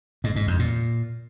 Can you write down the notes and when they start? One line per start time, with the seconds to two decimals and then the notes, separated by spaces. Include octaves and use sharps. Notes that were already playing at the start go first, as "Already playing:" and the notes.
0.24 G#2
0.36 G#2
0.47 F2
0.59 A#2